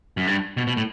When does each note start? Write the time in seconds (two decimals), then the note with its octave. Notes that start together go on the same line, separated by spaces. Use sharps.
0.17 F#2
0.27 G2
0.57 B2
0.67 B2
0.77 A2